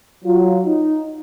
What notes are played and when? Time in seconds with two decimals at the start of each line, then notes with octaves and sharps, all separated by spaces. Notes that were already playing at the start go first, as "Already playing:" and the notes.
0.25 F#3 F4
0.66 D#4